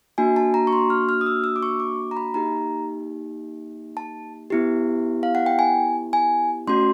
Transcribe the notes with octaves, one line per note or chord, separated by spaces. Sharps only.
A#3 D4 F#4 G#5
A5
A#5
C#6
C6
F6
F6
D#6
E6
E6
D6
C#6
D6
A#5
B5
A#3 D#4 G4 A#5
A5
B3 E4 G4
F5
F#5
G5
G#5
G#5
A3 C#4 F#4 C6